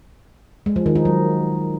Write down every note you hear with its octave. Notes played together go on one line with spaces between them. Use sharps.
G#3
F3
D#3
D#4
F#3